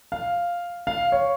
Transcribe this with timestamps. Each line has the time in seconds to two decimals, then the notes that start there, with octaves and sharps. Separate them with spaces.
0.12 F5
0.87 F5
1.12 C#5